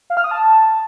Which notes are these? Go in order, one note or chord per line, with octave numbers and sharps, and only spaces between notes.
F5
F6
D#6
A5